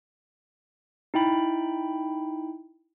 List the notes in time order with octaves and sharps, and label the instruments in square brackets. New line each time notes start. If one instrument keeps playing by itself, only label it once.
[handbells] D#4 E4 G5 B5